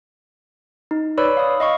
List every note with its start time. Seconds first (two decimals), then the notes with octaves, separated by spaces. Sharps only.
0.91 D#4
1.18 B4 C#5 D5 B5 E6
1.37 F5 D#6
1.60 D#5 F5 C#6